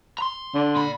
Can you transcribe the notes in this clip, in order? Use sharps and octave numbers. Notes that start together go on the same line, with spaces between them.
A#5 C6
D3
A#2 B5